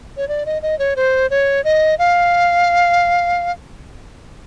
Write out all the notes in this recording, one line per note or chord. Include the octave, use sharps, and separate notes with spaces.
C#5
D5
D#5
D#5
C#5
C5
C#5
D#5
F5